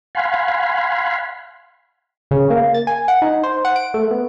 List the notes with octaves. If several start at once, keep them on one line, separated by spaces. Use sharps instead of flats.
F5 F#5 G#5 B5 C6
C#3
A#3
A6
G#5
F#5
D#4
C5
F#5
D7
A3
B3